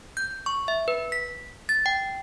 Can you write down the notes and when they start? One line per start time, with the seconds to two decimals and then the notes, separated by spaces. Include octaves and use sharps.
0.17 G6
0.46 C#6
0.68 E5
0.88 B4
1.12 B6
1.69 A6
1.86 G5